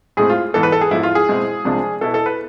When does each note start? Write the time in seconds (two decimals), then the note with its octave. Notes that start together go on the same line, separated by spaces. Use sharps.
0.17 A2 G#3 C4 G#4
0.30 F4
0.54 G#2 E3 B3 A4
0.63 B4
0.72 A4
0.81 G#4
0.91 G#2 F3 B3 E4
1.03 F4
1.15 G#4
1.28 B2 G#3 C4 E4
1.65 C2 C3 F3 G#3 D4
2.01 B2 B3 E4 A4
2.14 A4
2.26 B4